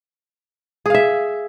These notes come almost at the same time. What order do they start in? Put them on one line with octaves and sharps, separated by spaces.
G#4 F5 E5